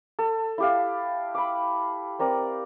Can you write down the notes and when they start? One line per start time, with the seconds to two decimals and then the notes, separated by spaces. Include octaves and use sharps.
0.19 A4
0.58 E4 G4 F5
1.35 B5 D6
2.19 C4 A#4 D5